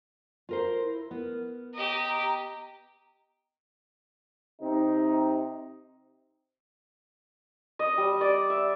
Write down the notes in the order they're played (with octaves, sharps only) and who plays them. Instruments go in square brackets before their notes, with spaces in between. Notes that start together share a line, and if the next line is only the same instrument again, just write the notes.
[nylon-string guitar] F4 A#4 C5
[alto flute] E4
[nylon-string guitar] B3 [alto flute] A#4
[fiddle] G4 D#5 [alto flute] A#5
[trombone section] C3 C4 D#4
[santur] D#5
G3
D5
E5